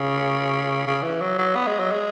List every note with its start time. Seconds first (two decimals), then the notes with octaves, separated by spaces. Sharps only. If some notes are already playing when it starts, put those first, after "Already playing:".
Already playing: C#3
0.87 C#3
1.03 E3
1.21 F#3
1.38 F#3
1.55 B3
1.67 G#3
1.79 F#3
1.92 G#3